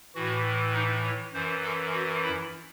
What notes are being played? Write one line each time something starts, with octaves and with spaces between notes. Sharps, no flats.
A2 E3 F#4
D#4
C#5
F#2 E3 C5
A4
F#4
E4